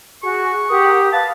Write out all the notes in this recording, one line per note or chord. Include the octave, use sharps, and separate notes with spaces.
F#4 G#4 C#6
G4 A#4 F#5 G5 D#6
B4 F5 A5